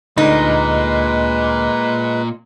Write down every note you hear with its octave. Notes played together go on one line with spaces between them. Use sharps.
D2 A#2 D3 G#3 A#3 D#4 B4